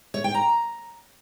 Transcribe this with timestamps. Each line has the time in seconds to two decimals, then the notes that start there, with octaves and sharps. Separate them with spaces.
0.14 C#5
0.24 G5
0.34 A#5